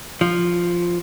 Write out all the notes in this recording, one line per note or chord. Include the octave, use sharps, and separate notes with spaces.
F3